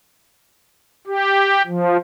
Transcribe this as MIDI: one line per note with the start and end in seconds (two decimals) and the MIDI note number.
1.07 1.62 67
1.67 1.97 53